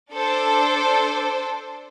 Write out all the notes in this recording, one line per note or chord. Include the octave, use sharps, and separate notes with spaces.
D4 A4 C5